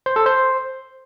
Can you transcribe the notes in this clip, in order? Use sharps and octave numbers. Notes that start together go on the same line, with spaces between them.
C5
A4
C5